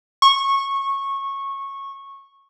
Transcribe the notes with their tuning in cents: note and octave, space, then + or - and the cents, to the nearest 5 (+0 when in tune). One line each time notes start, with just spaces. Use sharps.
C#6 -15